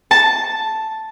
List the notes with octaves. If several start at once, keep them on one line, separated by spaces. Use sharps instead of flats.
A5